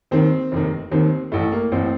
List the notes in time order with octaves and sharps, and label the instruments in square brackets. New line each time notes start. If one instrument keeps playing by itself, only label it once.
[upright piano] D#2 D#3 C4
F1 D#2 D#3
D#2 D#3 C4
A1 A2 A3
A#3
A1 A2 C4